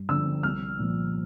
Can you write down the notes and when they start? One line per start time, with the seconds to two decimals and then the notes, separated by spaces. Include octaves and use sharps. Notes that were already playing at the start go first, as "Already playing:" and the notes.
Already playing: G2
0.09 D3 F3 E6
0.43 C2 F6
0.79 A#2 F3